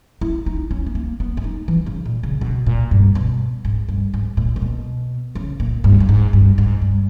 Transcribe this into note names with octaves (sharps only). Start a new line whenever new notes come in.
E4
D#4
C#4
B3
A#3
B3
C#4
D#4
E3
C#3
A#2
C#3
B2
A#2
G2
B2
G#2
G2
G#2
A#2
C#3
B2
C#3
A#2
G2
G2
G#2
G2
G#2
G2